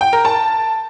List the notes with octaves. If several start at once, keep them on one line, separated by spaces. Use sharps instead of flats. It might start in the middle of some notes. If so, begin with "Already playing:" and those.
G5
A#4
A5